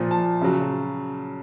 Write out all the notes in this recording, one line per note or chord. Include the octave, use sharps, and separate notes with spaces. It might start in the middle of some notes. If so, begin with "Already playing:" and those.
Already playing: A#2 F3
A5
C#3 F#3